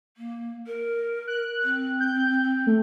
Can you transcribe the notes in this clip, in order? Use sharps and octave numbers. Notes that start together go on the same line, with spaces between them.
A#3
A#4
F#6
C4
G6
A3